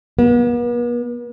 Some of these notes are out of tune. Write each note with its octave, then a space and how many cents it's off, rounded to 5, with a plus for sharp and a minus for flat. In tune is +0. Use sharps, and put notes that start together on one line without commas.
B3 -45